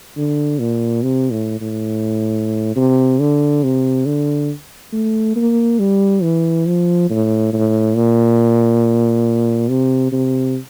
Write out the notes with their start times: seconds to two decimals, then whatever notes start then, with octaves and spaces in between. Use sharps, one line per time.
0.17 D3
0.59 A#2
1.03 C3
1.31 A2
1.61 A2
2.76 C3
3.20 D3
3.63 C3
4.06 D3
4.93 A3
5.36 A#3
5.80 G3
6.22 E3
6.67 F3
7.10 A2
7.53 A2
7.96 A#2
9.70 C3
10.12 C3